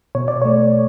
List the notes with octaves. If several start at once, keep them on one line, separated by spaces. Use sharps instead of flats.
B2 C#5
D5
A3 C#5